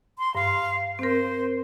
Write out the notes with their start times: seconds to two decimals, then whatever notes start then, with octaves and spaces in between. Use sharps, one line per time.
0.19 C6
0.35 G2 F5 C6
0.99 C4 A#4 C5